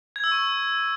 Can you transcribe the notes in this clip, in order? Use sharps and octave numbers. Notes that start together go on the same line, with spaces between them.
G#6
E6
C#6